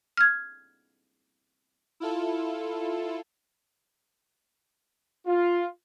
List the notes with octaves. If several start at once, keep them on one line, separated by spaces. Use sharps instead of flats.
F6 G#6
E4 F4 A4
F4